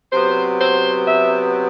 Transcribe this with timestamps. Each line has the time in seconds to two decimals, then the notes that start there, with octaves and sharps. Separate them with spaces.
0.12 C3 F#3 B3 C5
0.60 C5
1.07 E5